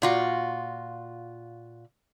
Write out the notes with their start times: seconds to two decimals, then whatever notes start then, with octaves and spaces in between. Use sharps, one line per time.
0.02 A#2 F4 F#4